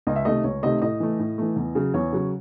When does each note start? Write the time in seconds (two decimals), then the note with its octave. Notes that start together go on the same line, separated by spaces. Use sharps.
0.07 C#2 D#5
0.16 E5
0.25 C3 D#3 A3 D#5
0.44 C#2 C#5
0.63 C3 D#3 A3 D#5
0.81 A2 D#5
1.00 E3 A3
1.19 A2
1.38 E3 A3
1.56 E2
1.75 C#3 F#3
1.94 E2 C#5
2.12 C#3 F#3